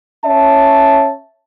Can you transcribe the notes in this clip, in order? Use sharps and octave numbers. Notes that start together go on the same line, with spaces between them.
C#4 C#5 E5 A5